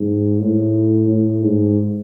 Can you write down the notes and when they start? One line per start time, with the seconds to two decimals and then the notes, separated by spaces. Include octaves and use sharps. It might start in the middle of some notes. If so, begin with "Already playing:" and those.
Already playing: G#2
0.39 A2
1.08 A2
1.43 G#2